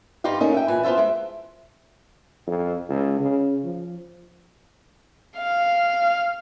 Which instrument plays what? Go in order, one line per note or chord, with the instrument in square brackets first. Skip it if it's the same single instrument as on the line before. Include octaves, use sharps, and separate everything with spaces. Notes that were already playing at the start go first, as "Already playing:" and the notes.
[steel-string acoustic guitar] G2 G3 D#4 F4 G4 F5
A3 A#3 C#4 D#4
E5 G5
A#2 E3 B4 G#5
B3 F4 C5 E5 A5
G#3 E5
[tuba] F2
C#2
C#3
F3
[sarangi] F5